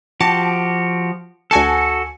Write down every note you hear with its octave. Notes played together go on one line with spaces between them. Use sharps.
F3 F#4 G4 A5
D2 F#4 A4 G#5 A5